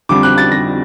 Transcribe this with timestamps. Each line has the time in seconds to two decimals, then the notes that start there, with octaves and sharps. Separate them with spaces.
0.09 F2 D3 G3 D6
0.23 F#6
0.38 A6
0.52 A#6